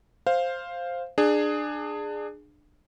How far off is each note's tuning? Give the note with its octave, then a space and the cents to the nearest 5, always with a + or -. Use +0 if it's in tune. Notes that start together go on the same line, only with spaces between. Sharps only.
C5 +5 F5 +0
D4 +25 G#4 +0